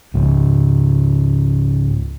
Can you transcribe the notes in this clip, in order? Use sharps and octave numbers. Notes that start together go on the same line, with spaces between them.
C#2 G#2